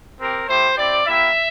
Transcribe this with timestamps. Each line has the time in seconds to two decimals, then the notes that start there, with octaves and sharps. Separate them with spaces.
0.19 C4 G4 A#4
0.48 A3 E4 G4 C5
0.77 C4 E4 G4 D5
1.06 A#3 E4 G4 E5